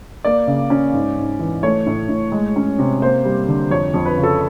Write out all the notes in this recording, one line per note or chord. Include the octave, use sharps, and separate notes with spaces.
A#3 D5
C#3
C#4
G#2
G#2
E3
A3 C#5
A2
A2
G#3
C#4
C3
A#3 C5
G3
D3
F2 C#5
F2
B4
C#3
A4